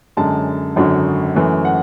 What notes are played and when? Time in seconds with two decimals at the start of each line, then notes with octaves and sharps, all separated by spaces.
0.17 F#2 D3 G#3 A5
0.76 G#1 F#2 D3 F#3
1.35 F#2 E3 A3
1.65 F#5